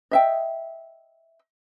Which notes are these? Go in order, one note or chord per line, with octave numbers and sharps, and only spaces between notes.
D#5 E5 G5